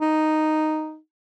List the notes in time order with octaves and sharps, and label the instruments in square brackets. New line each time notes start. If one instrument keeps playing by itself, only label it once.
[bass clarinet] D#4